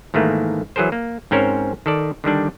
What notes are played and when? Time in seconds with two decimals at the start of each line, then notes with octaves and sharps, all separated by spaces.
0.14 G#2 D#3 E3 A3 A#3
0.76 E3 F#3 G#4 A#4 C5
0.92 A#3
1.31 G#2 C4 C#4 A#4 C5 C#5
1.86 D#3 A4 D5
2.24 D3 D#3 G3 D4